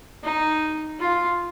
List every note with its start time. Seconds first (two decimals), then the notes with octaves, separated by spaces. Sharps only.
0.23 D#4
1.00 F4